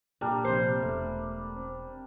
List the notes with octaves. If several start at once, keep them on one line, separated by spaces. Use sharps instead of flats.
A#2 G3 D4 A#4
A#1 C3 C5
E1 A3
C4